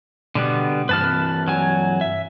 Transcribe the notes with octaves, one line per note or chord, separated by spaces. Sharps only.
B2 D3 G3 B3
G2 E3 B4 A5 F6
F#3 G#5
E5